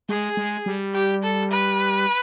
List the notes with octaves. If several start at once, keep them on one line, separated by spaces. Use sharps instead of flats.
G#3 G#4
G#3
G3
G4
A4
B4